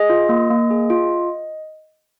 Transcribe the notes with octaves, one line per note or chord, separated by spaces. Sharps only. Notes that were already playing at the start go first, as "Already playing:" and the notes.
Already playing: G#4 D#5
F4
A#3
A#3
G#4
F4